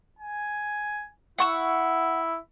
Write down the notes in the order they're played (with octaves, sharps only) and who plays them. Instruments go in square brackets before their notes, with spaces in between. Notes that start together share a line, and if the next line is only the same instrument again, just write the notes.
[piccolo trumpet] G#5
[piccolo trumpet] E4 [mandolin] F#5 C#6 E6